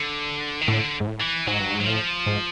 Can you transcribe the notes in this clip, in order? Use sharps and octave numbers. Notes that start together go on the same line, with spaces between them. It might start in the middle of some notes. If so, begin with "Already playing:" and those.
Already playing: D3
D#3
A2 D3
G#2
A2
E3
G#2 F#3
G2
G#2
F#3
A2 F3
G#2